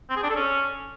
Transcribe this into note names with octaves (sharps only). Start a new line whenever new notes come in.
C4
G#4
D4
A4
C#4